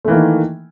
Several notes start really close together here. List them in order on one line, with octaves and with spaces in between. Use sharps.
A3 E3 A#3 D#3